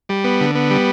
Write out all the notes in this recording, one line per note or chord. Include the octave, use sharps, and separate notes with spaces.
G3
B3
D3
B3
G3